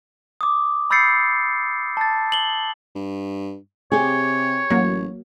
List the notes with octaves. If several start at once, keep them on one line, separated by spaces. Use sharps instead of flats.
D6 D#6
B5 E6 G6 A6 C7 C#7
A5 A6
F#7 G7
G2
C3 G4 G#4 C#5
A1 F#3 A#3